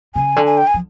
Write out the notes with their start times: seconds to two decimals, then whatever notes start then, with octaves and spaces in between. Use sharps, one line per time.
0.15 C#3 G#5
0.36 D3
0.46 G#5
0.58 G5
0.67 G#5
0.74 F3